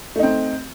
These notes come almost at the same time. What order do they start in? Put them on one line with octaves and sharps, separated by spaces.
A3 D#4 C4